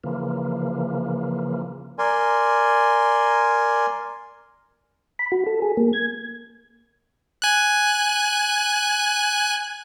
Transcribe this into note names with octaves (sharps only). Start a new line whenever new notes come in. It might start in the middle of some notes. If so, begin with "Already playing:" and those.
C#3 E3 F3 A#3
A#4 D5 G#5 C6
B5
F#4
A4
G#4
A#3
G#6
G#5 F#6